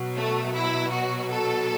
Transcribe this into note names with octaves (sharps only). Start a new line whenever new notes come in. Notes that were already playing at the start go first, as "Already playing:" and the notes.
Already playing: B2 F#3
A3
E4
F#4
A4